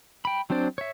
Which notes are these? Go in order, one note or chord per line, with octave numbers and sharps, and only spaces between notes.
G5 B5
F#3 C4 D4 C5 D5
C#5 E5